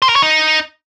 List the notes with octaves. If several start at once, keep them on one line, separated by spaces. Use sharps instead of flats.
C5
A#4
C#5
D#4